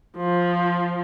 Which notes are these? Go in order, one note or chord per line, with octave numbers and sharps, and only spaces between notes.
F3